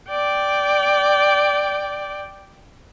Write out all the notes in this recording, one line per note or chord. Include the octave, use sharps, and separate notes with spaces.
D5 G5